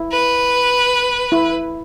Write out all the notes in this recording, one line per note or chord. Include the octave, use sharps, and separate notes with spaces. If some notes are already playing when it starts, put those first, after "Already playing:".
Already playing: E4
B4
E4